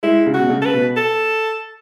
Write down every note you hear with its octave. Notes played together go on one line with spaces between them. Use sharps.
G#3 E4
C#3
F#4
B2
C#3
A4
B4
B2
A4